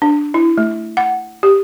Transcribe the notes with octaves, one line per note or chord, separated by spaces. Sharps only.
D4
E4
A3
F#5
G4